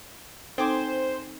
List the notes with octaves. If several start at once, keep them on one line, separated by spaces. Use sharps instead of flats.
C4 D#4 A4 C5 G5 G#5 D6